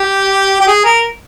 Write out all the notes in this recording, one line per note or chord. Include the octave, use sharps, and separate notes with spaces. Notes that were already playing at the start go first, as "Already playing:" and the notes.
Already playing: G4
G4
G#4
A#4